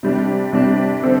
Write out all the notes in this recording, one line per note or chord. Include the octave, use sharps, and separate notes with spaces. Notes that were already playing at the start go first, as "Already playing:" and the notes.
C3 G3 D4
C3 G3 D4
D3 C4 A4